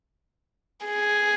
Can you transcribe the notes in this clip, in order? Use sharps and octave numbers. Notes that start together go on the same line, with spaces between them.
G#4